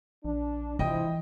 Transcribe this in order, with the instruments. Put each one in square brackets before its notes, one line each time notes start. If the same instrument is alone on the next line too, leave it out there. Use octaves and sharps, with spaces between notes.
[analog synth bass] A#1 [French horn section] D4
[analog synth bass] C3 [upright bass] E3 [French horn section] F3 E4 [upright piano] D#5 G5 D#6